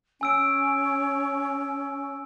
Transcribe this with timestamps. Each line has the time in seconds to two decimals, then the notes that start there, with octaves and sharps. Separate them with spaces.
0.21 C#4 G#5 E6 D7